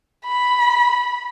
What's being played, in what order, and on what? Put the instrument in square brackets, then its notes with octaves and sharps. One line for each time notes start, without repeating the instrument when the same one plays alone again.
[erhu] B5